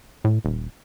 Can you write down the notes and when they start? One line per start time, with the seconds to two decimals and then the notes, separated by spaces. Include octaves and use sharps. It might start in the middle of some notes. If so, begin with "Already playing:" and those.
0.24 A2
0.45 D#1